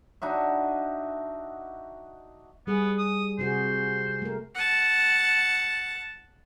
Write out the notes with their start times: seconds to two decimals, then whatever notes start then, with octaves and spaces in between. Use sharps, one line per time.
0.22 D4 D#4 F#4 E5
2.67 G3 B3 G#4
2.98 D#6
3.39 C3 F#4 G#4 C5
4.22 A3 A#4
4.55 F#5 A5